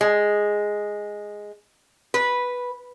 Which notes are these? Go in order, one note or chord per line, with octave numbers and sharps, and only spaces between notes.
G#3
B4